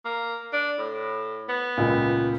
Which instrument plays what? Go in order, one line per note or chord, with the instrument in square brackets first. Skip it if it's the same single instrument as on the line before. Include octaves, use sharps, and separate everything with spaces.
[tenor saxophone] A#3
D4
A2
B3
[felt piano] C#2 A#2